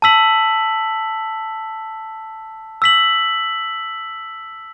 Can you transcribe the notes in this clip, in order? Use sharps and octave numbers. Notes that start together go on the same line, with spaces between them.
A5 E6 B6 F#7
E6 B6 F#7